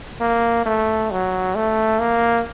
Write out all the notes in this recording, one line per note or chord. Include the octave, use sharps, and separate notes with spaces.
A#3
A3
F#3
A3
A#3